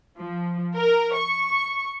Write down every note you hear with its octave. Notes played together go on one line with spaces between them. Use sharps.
F3
A#4
C#6